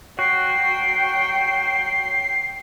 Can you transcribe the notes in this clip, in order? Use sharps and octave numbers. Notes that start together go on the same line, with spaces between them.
F#3 F#4 G5 C7